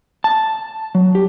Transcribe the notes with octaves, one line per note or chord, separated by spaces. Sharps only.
A5
F#3
G4